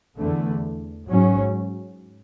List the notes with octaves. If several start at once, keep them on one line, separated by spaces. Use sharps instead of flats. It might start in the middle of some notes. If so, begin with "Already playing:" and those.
E2 D3 A3
G#2 F#3 C#4